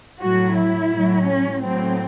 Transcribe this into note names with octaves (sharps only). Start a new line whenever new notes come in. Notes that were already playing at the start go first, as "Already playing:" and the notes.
A2 F#3 F#4
E4
A2 F#3
C#4
A2 F#3 C4